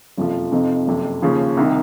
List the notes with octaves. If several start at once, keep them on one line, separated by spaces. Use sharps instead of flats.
F#1 F2 C3 F3
F2 C3 F3 C4 D#4
F#1 F2 C3
D#2 C#3 F3
C2 C3 D#3